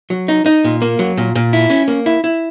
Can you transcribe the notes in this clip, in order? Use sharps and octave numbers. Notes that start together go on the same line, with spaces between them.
F#3
D#4
D#4
A#2
A#3
F#3
A#2
A#2
E4
C#4
A#3
E4
E4